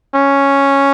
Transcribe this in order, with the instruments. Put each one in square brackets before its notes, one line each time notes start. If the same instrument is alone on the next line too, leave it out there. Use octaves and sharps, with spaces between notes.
[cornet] C#4